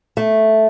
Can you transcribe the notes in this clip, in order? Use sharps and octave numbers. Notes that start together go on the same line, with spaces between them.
A3